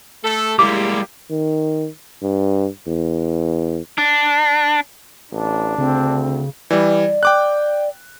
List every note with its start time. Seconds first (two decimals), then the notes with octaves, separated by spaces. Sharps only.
0.24 A3 A4
0.59 G3 G#3 A#3 E4 G4 D6
1.31 D#3
2.22 G2
2.87 E2
3.98 D4
5.32 A1 D4
5.78 D2 C#3 C4
6.71 E3 G3 D5
7.23 G5 D6 F#6